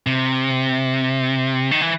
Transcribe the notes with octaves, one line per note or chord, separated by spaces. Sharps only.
C3
D#3
E3